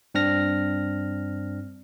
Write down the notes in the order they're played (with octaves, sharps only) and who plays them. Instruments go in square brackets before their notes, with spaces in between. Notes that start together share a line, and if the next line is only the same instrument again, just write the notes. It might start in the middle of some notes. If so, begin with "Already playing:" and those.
[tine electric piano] G2 C4 D4 F6 A#6